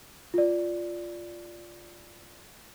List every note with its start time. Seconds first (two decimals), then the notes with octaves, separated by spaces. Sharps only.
0.34 F4 D5